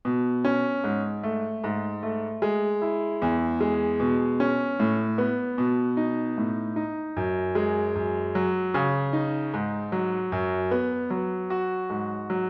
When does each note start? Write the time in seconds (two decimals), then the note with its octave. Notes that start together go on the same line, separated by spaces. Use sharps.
0.05 B2
0.45 C#4
0.84 G#2
1.23 A3
1.64 G#2
2.03 A3
2.42 G#3
2.82 E4
3.22 E2
3.60 G#3
4.00 B2
4.40 C#4
4.80 A2
5.18 B3
5.58 B2
5.97 D#4
6.38 A2
6.76 D#4
7.17 F#2
7.55 G#3
7.95 F#2
8.35 F#3
8.74 C#3
9.13 D#4
9.54 G#2
9.92 F#3
10.32 F#2
10.71 B3
11.10 F#3
11.50 F#4
11.90 G#2
12.30 F#3